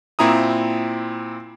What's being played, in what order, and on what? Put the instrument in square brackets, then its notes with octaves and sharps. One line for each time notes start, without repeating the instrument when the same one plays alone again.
[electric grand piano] A#2 C4 E4 A#5 D#6